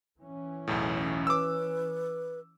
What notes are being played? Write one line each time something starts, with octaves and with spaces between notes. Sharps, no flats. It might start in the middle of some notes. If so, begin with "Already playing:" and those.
E3 C#4
B1 E2 A2
B4 D6 E6